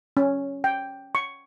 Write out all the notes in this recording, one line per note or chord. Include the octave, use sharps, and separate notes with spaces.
C#4
G5
C#6